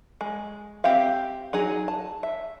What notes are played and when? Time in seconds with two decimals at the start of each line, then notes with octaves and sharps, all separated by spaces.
0.21 G#3
0.84 C4 G4 E5 F5
1.53 F#3 D#4 G#4
1.88 A5
2.23 E5